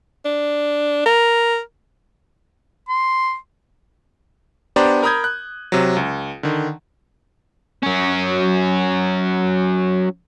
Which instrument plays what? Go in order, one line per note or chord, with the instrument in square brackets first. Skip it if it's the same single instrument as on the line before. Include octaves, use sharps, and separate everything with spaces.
[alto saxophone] D4
A#4
[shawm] C6
[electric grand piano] B3 D4 G4 C5 D5 A#5
A#4 A#5 B5 D#6 G6 G#6
F#6
C3 F#3
C#2
D3 D#3
[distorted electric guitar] F#3 C#4